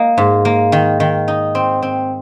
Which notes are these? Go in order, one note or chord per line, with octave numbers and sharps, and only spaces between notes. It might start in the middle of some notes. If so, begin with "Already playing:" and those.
Already playing: A#3 D#4
G#2
A#3
D#3
D#3
D#4
C4
C4